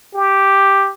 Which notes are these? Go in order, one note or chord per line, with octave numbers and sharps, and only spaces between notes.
G4